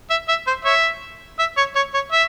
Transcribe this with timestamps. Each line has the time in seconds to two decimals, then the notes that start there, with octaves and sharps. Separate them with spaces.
0.10 E5
0.28 E5
0.47 C5
0.65 C#5 E5
1.39 E5
1.57 C#5
1.76 C#5
1.94 C#5
2.12 E5